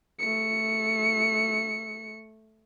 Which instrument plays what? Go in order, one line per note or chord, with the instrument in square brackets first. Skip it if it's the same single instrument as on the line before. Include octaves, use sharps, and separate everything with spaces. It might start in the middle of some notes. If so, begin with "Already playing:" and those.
[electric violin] A3 C#7